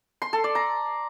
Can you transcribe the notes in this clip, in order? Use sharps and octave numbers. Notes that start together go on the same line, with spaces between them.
C6
A4
D5
A#5